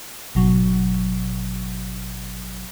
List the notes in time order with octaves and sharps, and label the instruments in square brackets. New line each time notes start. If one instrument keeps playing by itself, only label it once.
[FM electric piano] G#1 B2 F#3